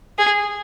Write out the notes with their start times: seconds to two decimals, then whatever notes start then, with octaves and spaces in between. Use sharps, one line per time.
0.18 G#4